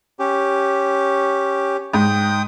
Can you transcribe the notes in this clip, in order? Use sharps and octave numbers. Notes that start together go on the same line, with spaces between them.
C#4 G4
G#2 G5 D#6